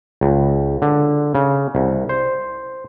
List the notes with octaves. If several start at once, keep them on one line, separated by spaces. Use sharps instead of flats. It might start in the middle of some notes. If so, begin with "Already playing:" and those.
C#2
D3
C#3
C2
C5